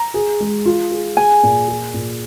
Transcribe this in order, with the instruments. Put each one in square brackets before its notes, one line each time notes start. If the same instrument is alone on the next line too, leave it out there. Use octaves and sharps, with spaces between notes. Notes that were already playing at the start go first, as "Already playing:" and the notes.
Already playing: [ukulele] A#5
[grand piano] G#4
G#3
F4
G#4
[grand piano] G#4 [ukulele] G#5
[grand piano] A#2
G#4
A#2